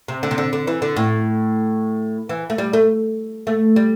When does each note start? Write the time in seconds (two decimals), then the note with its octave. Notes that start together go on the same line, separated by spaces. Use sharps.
0.08 C3
0.23 D3
0.31 C3
0.38 D3
0.53 D3
0.67 E3
0.82 D3
0.96 A2
2.29 E3
2.50 A3
2.58 G3
2.73 A3
3.47 A3
3.76 G3